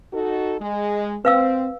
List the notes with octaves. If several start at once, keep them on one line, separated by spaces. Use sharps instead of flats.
D#4 F#4 A4
G#3
C4 B4 F5 E6